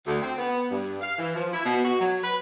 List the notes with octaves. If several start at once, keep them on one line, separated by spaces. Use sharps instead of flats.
D2
C4
B3
G2
F5
E3
F3
E4
B2
F#4
F#3
B4